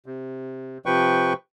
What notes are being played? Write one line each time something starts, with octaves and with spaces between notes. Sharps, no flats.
C3
C3 F3 B4 G5 C#6